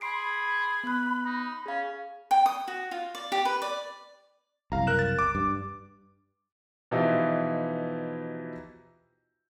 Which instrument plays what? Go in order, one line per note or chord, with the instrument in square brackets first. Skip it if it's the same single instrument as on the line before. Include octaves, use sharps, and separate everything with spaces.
[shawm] G#4 [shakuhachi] B5 [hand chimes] C6 C7 D7
[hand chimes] B3 F#6
[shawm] D#4
[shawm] C#4 [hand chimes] G#4 F5
[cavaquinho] G5
D#6
F#4
F4
D5
G4
B4
D5
[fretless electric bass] F#1 C2 [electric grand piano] F5 A#5
[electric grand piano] A#4 F#6 E7
A6
D6
[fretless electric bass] G2
[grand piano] B2 E3 F3 D#4 E4 G4